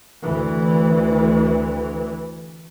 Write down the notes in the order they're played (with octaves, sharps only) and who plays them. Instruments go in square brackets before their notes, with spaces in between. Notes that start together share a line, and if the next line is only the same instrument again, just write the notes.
[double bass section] D2 E3